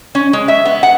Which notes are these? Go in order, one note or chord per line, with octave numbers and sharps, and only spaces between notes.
C#4
G#3
E5
B3
F#5